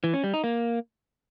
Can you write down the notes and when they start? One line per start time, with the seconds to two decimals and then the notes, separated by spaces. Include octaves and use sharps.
0.04 E3
0.14 C#4
0.24 G3
0.34 D#4
0.44 A#3